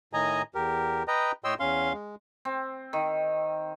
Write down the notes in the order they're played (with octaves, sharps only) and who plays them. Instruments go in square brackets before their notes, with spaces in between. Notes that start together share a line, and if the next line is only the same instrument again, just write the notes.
[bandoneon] A2 D#3 D#5 G#5 A#5
E2 G4 A#4
B4 D#5 G5 A#5
A2 C#5 D#5 G5 C6 E6
E2 C#4 F5 C6
G#3
[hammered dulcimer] C4
D#3